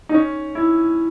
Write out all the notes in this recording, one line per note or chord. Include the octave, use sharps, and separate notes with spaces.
D#4
C#4
E4